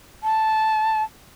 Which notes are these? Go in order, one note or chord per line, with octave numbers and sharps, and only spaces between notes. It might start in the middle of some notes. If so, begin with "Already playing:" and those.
A5